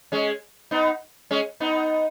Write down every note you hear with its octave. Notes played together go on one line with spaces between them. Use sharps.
G#3 C#4
B3 D#4
G#3 C#4
B3 D#4